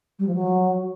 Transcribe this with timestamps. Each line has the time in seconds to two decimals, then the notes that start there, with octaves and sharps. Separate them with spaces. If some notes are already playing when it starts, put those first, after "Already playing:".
0.19 G3
0.27 F3
0.35 F#3